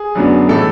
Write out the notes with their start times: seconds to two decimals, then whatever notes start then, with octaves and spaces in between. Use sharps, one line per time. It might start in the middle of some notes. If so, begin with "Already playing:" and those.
Already playing: G#4
0.15 F#2 D3 F#3 B3 D4
0.48 A2 E3 G#3 A4